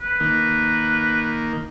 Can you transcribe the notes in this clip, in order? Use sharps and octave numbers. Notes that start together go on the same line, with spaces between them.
B4
D#3 A#3